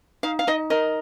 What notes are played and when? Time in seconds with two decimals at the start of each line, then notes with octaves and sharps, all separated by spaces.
0.23 D#4 F5
0.39 F5
0.47 D#4 D#5
0.70 A#4 D#5